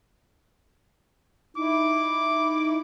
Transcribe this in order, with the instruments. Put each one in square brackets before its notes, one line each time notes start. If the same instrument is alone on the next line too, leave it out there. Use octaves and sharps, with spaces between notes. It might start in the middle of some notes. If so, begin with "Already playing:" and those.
[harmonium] D#4 E4 [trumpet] D6